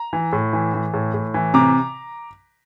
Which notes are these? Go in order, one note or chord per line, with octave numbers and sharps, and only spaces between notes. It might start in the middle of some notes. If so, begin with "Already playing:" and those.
Already playing: A#5
E3
A2
E3
E3
A2
A2
E3
C3 A#5 D6